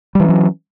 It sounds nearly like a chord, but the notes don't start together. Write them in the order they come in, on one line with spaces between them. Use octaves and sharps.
G3 E3 C#4 F#3